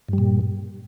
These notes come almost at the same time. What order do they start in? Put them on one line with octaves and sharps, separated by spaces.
G2 G3 A#2